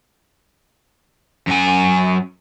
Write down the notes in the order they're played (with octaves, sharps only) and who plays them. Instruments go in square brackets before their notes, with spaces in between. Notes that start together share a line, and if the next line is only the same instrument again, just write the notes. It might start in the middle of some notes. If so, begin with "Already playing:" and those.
[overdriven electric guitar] F#2 G#5